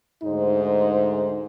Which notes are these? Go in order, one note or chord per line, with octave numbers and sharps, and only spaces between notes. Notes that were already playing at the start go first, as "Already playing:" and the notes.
D2 G#2 D#4 C5